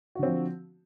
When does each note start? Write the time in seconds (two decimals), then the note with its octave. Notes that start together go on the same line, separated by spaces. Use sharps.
0.15 F#4
0.19 D3
0.23 C4
0.27 F3